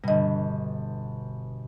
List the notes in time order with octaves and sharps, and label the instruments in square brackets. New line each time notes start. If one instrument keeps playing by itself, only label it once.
[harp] G1 B2 [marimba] G3 D#5